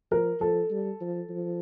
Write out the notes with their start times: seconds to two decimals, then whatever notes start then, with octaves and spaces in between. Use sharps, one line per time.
0.11 F3 A#4
0.41 F3 A4
0.70 G3
1.01 F3
1.30 F3